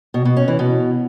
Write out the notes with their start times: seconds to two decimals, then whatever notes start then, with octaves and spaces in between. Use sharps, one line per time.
0.14 B2
0.25 B2
0.37 C#4
0.48 E3
0.59 B2